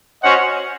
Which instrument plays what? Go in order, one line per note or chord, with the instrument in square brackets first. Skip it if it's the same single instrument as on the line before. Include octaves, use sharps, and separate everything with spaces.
[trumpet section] C#4 F#4 C5 D#5 F#5